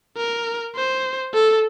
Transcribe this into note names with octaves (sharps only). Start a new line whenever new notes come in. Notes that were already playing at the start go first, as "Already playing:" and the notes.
A#4
C5
A4